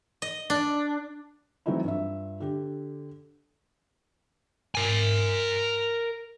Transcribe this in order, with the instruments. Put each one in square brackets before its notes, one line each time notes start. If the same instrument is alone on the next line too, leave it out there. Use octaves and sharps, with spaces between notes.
[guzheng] D#5
D4
[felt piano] E3 F#3 A3 C4 D#4 E4
G2 F4 E5
D3 G4
[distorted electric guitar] A#4 G#5